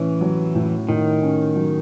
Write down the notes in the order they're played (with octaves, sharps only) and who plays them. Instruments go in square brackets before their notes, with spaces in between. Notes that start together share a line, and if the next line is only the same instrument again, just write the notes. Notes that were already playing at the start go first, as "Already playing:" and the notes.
Already playing: [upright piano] A2 C#4 [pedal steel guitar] E3
[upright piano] F#3
A2
[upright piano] A2 [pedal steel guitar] D#3
[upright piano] C#4
F#3